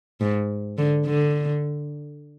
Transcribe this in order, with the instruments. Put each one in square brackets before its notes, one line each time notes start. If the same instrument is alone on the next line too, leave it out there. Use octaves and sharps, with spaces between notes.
[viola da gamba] G#2
D3
D3